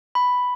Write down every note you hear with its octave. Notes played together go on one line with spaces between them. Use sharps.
B5